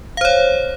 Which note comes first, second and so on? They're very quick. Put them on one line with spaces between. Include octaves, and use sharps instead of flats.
F5 C5 C#5